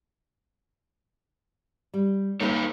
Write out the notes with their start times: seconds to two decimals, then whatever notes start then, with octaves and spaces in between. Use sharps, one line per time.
1.94 G3
2.40 A#3 D#4 A4 B4 C#5